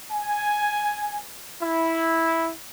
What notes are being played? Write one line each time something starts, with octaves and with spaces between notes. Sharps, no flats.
G#5
E4